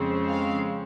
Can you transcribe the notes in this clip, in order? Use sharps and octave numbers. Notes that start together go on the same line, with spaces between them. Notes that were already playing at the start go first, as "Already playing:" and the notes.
Already playing: F2 C#3 G#3 C4
F5